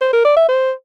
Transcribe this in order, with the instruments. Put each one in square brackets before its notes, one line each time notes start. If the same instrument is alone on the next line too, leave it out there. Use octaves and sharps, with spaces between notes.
[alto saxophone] C5
A#4
D5
E5
C5